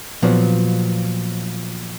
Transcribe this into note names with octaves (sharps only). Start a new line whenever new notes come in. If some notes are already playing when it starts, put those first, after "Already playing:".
A#2 F3 F#3 B3